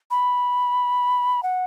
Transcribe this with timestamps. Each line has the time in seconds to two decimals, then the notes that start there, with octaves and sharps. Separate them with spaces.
0.11 B5
1.43 F#5